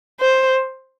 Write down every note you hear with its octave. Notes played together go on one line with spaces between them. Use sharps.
C5